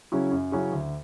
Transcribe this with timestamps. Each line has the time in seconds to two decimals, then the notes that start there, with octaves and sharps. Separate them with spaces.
0.12 C#3 F#3 C#4 E4
0.32 F#2
0.52 C#3 F#3 C#4 E4
0.72 D2